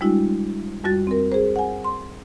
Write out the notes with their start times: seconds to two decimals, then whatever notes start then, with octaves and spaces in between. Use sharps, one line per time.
0.01 G3 G#3 D4 E4 F#4
0.84 F2 G3 F#4 A6
1.07 C4 A#4
1.32 G#4 C5
1.56 F#5 G#5
1.84 C6